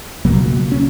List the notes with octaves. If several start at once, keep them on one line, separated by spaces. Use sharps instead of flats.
C#2 B2 F#3 A#3
C#4